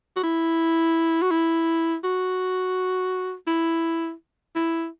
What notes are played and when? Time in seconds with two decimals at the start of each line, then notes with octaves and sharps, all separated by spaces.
0.16 F#4
0.23 E4
1.22 F#4
1.31 E4
2.04 F#4
3.47 E4
4.56 E4